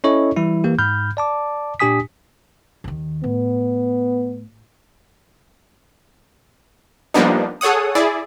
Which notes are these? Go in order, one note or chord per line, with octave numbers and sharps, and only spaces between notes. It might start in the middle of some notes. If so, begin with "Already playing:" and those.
C#4 E4 A4 C#5 D#5 C#6
E3 G3 E4
E3 A#3 G4
G#2 B5 F6 G6
D5 A5 D6
A#2 D4 G4 G#5 D#6 B6
D#2 D#3
A2 B3
F3 G3 A#3 B3 D4 D#4
G#4 A4 C#5 F#5 D#6
E4 G#4 D5